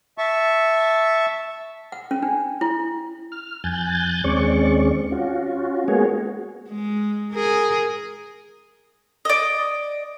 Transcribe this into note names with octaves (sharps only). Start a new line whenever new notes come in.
E5 A5 C#6
F#5
C#4
D4
E4
F6
F2 G#5 F#6 G6 A6
D#2 G#3 C4 C#4 D5 C#6
C#4 F4 F#4
G#3 A#3 B3 F#4 G#4 C#5
G#3
G#4 A#4
D5 D#5